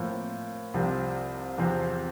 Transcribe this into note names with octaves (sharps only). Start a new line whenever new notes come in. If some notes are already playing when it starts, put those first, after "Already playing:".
Already playing: A2 F3 A#3
C2 C3 F3 C4
E2 C3 F3 C4